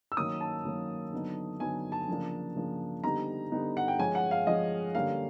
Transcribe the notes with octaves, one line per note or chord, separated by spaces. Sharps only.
E6
D#3 F#3 A#3 C#4 D#6
A5
D#3 F#3 A#3 C#4
D3 F#3 B3 D#4
D3 F#3 B3 D#4 G#5
A5
C#3 F3 A#3 D4
C#3 F3 A#3 D4
D3 G3 B3 D#4 A#5
D3 G3 B3 D#4
F#5
G5
F3 G#3 C#4 G#5
F#5
F5
F3 G#3 C#4 D#5
D3 G3 A#3 C#4 F5